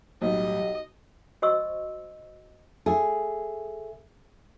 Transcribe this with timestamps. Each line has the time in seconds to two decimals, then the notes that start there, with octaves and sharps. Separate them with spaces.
0.22 B1 A2 E3 G3 G4 D#5
1.42 F#4 C5 D#5 C6 C#6 E6
2.86 G#4 A4 E5